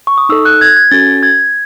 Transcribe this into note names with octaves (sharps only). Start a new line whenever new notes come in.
C#6
D#6
D#4 A4 E6
F#6
G#6
G#6
C#4 F#4 A4 A6
G#6